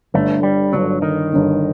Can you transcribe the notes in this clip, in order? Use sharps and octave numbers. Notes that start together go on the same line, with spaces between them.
G1 G2 D3 A3
G3
G1 G2 D3 F#3
D#3
G1 G2 D3